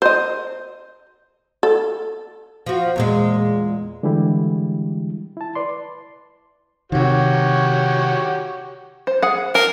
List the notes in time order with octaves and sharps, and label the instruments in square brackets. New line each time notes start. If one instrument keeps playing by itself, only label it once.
[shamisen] C5 D#5
A4
[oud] F3 F#4
E2 A#2 G#3
[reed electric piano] D3 E3 G3 G#3 E4 G4
E4 A5
B4 D5 C6
[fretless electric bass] C3 D#3 [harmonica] F#4 G4 C#5
[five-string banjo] C5
G#4 F#5
[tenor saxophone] A#4 [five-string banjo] A5